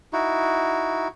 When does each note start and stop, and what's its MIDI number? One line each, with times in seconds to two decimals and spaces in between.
0.13 1.08 63
0.13 1.08 64
0.13 1.08 66